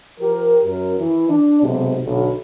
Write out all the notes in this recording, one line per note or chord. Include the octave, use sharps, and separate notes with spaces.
F3 G4 A#4
F#2 A#4
E3
D4
B1 G#2 C3
B1 D3